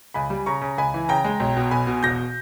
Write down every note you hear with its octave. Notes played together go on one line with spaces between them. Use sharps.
C#2 G#5 B5
G3
C#3 A#5 C#6
C#3
C#2 G#5 B5
E3
C#3 G5 A#5
G#3
B1
B2
B1 G#5 B5
B2
E1 G6 A#6